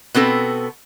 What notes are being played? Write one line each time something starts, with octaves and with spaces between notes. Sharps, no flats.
B2 B3 C4 A4